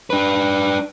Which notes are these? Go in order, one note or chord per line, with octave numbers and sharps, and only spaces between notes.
D4 B4